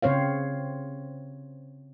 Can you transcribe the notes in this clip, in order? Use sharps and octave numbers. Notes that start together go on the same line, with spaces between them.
C#3 C4 C5 C#5 F5